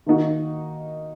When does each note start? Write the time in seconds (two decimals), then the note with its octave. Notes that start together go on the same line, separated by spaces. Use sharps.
0.06 D#3 A#3 D#4 F#4